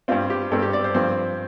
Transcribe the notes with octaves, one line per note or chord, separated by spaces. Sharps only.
G2 G3 C4 F4
G4
G2 G3 C4 A4
G4
D5
C5
G2 F3 C4 C5